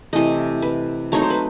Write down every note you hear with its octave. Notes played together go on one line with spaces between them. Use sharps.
C3 E3 A3 D#5
B4
F#3 A3 C4 D#4 C#5
C5
B4